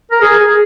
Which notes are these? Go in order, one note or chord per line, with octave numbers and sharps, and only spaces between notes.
A#4
G#4
G#4